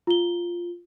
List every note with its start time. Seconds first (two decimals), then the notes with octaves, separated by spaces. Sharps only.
0.07 F4 G7